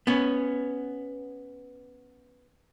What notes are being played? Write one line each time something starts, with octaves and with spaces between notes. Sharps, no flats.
B3 C#4